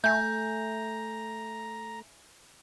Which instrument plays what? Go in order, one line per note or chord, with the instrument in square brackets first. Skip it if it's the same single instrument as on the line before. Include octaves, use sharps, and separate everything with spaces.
[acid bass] A3 [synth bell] E5 G#5 [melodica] A#5 [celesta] G6